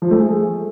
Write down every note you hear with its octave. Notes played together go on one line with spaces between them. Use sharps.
F3
A3
G#4